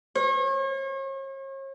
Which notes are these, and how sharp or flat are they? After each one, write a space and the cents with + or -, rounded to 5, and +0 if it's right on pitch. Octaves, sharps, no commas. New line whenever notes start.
C#5 -40